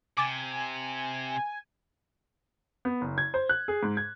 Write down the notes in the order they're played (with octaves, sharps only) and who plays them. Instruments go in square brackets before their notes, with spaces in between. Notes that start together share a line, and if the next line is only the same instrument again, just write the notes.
[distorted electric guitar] C3 [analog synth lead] G#5 [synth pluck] D6 A6
[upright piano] B3
F#1
G#6
C5
F#6
G#4
G#2
G#6